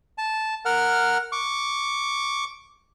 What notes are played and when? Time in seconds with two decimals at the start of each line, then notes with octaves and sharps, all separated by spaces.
0.18 A5
0.65 A#4 F#5 F6
1.32 C#6 D6